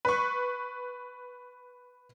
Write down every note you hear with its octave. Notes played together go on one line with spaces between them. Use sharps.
B4 C#6